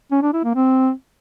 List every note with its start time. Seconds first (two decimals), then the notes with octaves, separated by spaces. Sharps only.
0.11 C#4
0.22 D4
0.33 E4
0.44 A#3
0.55 C4